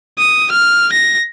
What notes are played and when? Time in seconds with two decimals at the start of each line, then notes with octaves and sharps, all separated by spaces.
0.19 D#6
0.52 F6
0.92 A#6